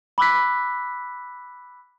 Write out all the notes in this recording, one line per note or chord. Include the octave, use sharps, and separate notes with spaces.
B5 D6 E6 F#6 B6